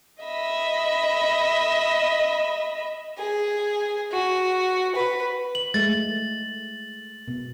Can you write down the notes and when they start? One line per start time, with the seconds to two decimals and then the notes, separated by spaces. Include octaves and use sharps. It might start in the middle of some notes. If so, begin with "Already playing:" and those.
0.22 D#5 E5 B5
3.18 G#4
4.12 F#4
4.95 B4
5.55 F#7
5.74 G#3 A3 A6
7.28 B2